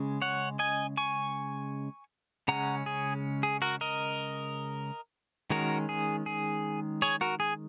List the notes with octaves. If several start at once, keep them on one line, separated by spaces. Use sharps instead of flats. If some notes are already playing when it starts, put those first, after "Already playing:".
Already playing: C#3 G#3 C#4
C#5 F#5
D#5 G#5
G#5 C#6
C#3 G#3 C#4 F#5 A#5
G#4
G#4
F#4 A#4
A#4 D#5
D#3 G#3 C#4 F#4 A#4
G#4
G#4
G#4 C#5
F#4 A#4
G#4